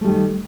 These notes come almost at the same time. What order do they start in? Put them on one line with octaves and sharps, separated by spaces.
A3 G3 D#3